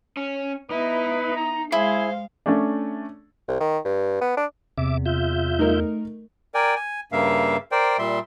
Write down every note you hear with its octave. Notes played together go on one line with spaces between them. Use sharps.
C#4
B3 D#4 E4 B4
A#5
G#3 E4 G#4 C5 F5
A3 C#4 D4
C2
D#3
G2
B3
D4
E2 C3 E5 D6
F4 E5 G6
A3 D#4 A#4
A#4 D5 G5 G#5
G#5
G2 C#3 A#3 E5 F5
A#4 C5 D5 G5
A#2 G3 E5 C6